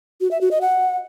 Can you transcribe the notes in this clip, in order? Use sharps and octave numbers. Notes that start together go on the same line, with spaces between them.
F#4
E5
F#4
D#5
F#5